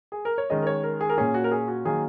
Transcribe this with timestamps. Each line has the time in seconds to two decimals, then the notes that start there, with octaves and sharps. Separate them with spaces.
0.12 G#4
0.25 A#4
0.38 C#5
0.50 D#3 G#3 C#4 D#5
0.62 A#4
0.67 C#5
0.83 A#4
1.01 G#4
1.09 A#4
1.18 A#2 A#3 C#4 G#4
1.34 F#4
1.44 A#4
1.51 G#4
1.68 F#4
1.85 D#3 F#3 A#3 G#4